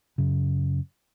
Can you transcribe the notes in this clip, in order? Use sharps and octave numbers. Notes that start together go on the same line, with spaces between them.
F#2 C#3